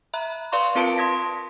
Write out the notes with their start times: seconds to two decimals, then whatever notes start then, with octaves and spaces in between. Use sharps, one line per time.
0.14 E5 A#5 B5 F#6
0.52 B4 D5 F5 C6 C#6
0.75 C4 F4 A#4 B4 A5 D7
0.97 C6 D#6 G#6 A#6 B6